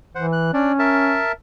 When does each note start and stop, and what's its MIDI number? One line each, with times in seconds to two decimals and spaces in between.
0.15 0.51 52
0.15 0.26 72
0.15 0.26 78
0.33 0.51 90
0.53 1.20 61
0.53 0.72 62
0.53 0.72 74
0.79 1.32 70
0.79 1.32 76
0.79 1.32 81